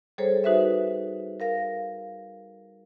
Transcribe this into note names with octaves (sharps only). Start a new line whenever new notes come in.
G3 G#4 A4 C5 C#5
D#4 F#4 B4 C5 E5
A#4 F5 A#6